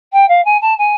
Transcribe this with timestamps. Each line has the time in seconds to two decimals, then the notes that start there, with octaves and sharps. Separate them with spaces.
0.13 G5
0.28 F5
0.45 G#5
0.61 A5
0.78 G#5